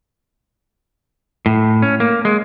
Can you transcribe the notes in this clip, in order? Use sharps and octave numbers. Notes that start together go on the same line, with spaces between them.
A2
C#4
A#3
G#3